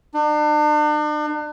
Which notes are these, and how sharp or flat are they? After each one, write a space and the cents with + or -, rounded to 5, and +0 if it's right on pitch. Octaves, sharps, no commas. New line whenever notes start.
D4 +40